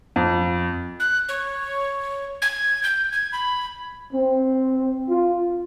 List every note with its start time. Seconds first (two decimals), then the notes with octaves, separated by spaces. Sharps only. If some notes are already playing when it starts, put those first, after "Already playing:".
0.16 F2
1.00 F#6
1.29 C#5
2.42 G#6
2.84 G6
3.12 G#6
3.33 B5
4.13 C4
5.09 F4